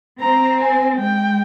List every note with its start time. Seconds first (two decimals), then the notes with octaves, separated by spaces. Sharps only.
0.21 C4 A#5
0.60 G#5
0.99 G#3 G5